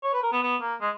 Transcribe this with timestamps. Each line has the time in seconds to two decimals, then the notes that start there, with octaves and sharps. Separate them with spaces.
0.03 C#5
0.13 B4
0.23 A#4
0.32 B3
0.42 B3
0.61 A#3
0.81 G#3